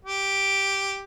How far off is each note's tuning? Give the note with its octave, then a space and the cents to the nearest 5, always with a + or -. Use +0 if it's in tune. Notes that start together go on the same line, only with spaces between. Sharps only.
G4 +0